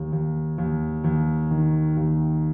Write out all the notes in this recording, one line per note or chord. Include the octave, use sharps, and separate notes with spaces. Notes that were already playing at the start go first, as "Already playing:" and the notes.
Already playing: D#2
D#2
D#2
D#2
D#3
D#2